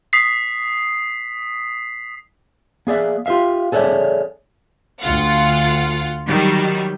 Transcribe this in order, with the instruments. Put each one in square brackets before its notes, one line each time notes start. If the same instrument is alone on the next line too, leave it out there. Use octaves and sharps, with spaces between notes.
[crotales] D#6 B6 C7
[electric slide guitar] A#3 G#4 D5 E5
F4 G4 A4 E5 F5
G#4 A4 C#5 D5 E5
[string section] D2 F4 F5 F#5
D#3 F#3 G3